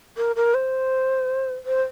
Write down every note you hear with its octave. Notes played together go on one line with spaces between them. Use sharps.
A#4
A#4
C5
C5